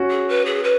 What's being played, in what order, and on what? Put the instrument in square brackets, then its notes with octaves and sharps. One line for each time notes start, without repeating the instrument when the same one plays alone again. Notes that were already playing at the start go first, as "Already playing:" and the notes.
Already playing: [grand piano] C#4 F#4
[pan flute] G#4
B4
G#4
B4